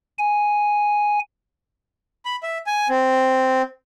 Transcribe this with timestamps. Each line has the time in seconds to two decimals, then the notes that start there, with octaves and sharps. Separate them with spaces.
0.18 G#5
2.25 B5
2.43 E5
2.67 G#5
2.89 C4